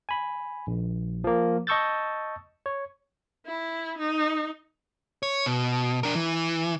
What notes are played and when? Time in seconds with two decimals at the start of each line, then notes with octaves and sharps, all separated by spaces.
0.09 G#5 B5
0.67 A#1
1.24 F3 A#3
1.67 D#5 A5 C#6 E6 G6 A6
2.66 C#5
3.47 E4
3.99 D#4
5.23 C#5
5.46 B2
6.03 D4 A#4
6.15 E3